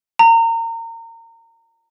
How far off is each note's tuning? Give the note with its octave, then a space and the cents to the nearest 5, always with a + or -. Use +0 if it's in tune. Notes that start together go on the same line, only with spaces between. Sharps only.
A#5 -30